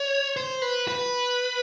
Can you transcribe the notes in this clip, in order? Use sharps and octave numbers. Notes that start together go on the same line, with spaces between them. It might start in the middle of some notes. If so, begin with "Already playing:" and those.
Already playing: C#5
C5
B4
B4